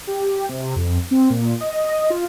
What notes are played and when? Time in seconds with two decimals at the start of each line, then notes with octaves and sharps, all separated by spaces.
0.07 G4
0.49 C3
0.76 F2
1.11 C4
1.30 A#2
1.61 D#5
2.10 F4